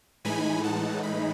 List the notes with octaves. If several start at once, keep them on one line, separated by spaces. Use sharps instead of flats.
A2 E3 G#3 D#4 G#5 B5
F#5 A5
B5